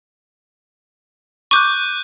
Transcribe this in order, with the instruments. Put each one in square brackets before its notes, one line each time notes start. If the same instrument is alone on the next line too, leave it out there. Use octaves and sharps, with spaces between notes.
[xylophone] C#6 D6 [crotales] F#6 G6 D#7